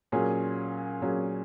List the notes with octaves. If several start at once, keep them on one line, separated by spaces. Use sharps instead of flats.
A#2 F#3 C#4 G#4
A#2 F#3 C#4 G#4